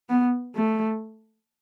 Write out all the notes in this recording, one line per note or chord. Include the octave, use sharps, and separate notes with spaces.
B3
A3